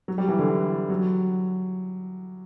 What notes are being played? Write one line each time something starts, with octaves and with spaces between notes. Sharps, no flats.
F#3
G3
E3
D3
E3
F#3